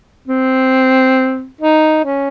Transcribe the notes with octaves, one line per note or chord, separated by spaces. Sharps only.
C4
D#4
C#4